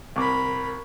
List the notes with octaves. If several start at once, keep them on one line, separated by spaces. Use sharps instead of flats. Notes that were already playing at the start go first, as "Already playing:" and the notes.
C2 A#4 B5 D6